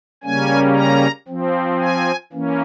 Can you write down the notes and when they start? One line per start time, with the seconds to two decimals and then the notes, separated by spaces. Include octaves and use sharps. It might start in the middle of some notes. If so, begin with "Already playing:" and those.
0.23 C#3 G3 A#3 C#4 G#5
0.75 A#5
1.28 F3 C4
1.80 G#5
2.33 E3 A#3 C#4